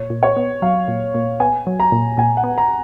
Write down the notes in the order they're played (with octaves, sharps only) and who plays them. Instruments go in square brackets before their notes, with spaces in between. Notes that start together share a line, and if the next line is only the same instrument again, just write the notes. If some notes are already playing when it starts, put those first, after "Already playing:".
Already playing: [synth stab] A#2 [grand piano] C#5
[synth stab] A#2
[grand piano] C#5
[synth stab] B3
[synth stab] F#3 [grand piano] F5
[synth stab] A#2
A#2
[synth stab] B3 [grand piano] G#5
[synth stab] F#3
[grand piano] A#5
[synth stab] A#2
[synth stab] A#2 [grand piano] G#5
[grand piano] F#5
[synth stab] B3
[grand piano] A#5